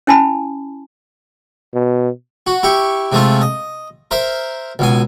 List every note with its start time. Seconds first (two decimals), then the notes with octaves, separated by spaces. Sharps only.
0.07 C#4 E4 G#5 A5 B5
1.74 B2
2.47 F#4
2.63 E4 G4 C#6
3.12 C3 G#3 A3 F4
3.41 D#5
4.11 A#4 C5 E5
4.79 C#2 B2 G#5